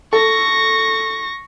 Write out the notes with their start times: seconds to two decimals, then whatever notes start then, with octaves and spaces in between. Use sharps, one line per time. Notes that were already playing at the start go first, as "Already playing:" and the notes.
0.13 A4 C#6 A#6